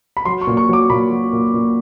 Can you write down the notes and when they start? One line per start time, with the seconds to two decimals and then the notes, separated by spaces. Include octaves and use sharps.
0.17 B5
0.25 F#3 C6
0.41 C#6
0.47 A#2
0.57 C#6
0.69 F#3 D6
0.89 A#2 B5
1.11 F#3
1.32 A#2
1.54 A#2